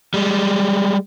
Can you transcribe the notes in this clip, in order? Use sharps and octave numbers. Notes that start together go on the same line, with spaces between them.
G3 G#3